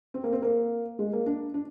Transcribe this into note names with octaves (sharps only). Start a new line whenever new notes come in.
C4
A#3
C4
A#3
G#3
A#3
D4
D4